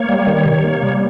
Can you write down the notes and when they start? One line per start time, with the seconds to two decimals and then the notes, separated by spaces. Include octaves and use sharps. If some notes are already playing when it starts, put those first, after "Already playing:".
Already playing: A#3 C#5
0.09 G3
0.27 D#3
0.46 C3
0.64 A#3
0.82 G3